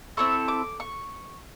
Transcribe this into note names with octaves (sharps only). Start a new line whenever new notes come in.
C4 E4 A4 C#6
D6
C#6